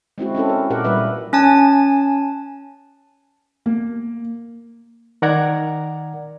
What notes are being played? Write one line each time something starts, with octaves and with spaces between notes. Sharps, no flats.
G#3 C4 E4 F#4
C4 C#4 E4 A4
A#4
A#2 G4 A#4 F#5
A#2 G3 A#3 B4 E5
C#4 G#5 A5
A#3
D#3 A#4 D5 F#5 A#5 G#6